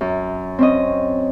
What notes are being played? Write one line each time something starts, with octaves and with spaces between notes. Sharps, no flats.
F#2
C4 C#4 D#5